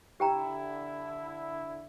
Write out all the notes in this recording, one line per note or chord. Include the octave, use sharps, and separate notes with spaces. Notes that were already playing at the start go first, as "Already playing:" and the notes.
D3 E4 G4 G5 A#5